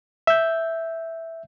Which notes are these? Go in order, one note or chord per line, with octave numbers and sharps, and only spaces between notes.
E5 G6